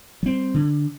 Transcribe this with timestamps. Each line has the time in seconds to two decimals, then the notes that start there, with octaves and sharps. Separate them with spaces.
0.23 G3 C4
0.54 D3